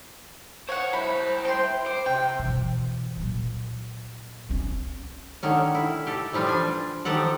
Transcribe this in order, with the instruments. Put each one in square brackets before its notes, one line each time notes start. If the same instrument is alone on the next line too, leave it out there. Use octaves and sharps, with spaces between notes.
[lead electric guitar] C5 F5 [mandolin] C#5 F#5
[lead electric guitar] E4 C5 [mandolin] B5
[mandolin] G5 C6
[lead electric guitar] C5 [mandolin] D6
[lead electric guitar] C3 [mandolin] G5
[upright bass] B2 E3
A#2 F#3
C4 C#4
[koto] D3 D#3 C#4
E4
G4 A4
E3 F3 G3 F4
D4 G#5
D#3 F3 G4 A4 F#5